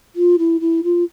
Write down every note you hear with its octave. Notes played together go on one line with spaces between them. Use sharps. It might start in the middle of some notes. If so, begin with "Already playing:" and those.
F4
E4
E4
F4